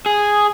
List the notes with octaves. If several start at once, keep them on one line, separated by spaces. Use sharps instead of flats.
G#4